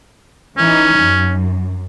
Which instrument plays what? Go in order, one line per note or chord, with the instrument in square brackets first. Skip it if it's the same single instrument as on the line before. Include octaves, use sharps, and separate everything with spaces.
[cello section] E3 D#4 [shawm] C#4
[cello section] F#2